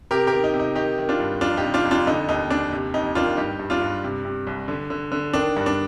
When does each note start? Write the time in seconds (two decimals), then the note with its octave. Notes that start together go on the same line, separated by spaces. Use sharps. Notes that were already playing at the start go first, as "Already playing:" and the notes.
0.11 C3 G4 A#4
0.27 G4 A#4
0.33 D#3
0.44 D#4
0.54 C3
0.60 D#4
0.75 D#3 D#4 G4
0.98 D#3
1.09 D4 F4
1.20 G2
1.41 F2 D4 F4
1.57 D#4 G4
1.64 C3
1.74 D4 F4
1.85 F2
1.91 D4 F4
2.07 D3 D#4
2.29 D#2 D#4
2.50 D#2 D4
2.73 C3
2.94 F2 D#4
3.15 D#3 D4 F4
3.37 G2 D#4 G4
3.59 G2
3.70 D4 F4
3.82 G2
4.04 C3
4.25 C3
4.47 C2
4.68 D3
4.90 D3
5.12 D3
5.33 D#3 D4
5.56 G2
5.66 D4